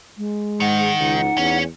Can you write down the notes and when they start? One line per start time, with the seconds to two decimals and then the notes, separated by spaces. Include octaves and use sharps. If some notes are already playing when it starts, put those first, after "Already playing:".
0.17 G#3
0.60 G#2 D#3 F#5
0.99 C#2 D#4
1.37 E2 C#4